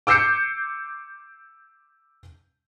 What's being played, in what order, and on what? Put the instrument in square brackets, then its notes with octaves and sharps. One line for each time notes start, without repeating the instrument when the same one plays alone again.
[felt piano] D6 E6 G6 C7 C#7